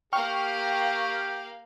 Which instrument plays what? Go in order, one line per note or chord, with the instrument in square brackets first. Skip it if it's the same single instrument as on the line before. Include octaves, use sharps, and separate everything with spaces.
[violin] A#3 F5 [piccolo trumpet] G4 [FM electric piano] G5 C#6 F6